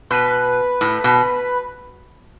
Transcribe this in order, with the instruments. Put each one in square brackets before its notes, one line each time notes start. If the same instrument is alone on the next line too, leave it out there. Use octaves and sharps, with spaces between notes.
[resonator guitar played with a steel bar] B2 [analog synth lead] B4
[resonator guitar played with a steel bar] A2
B2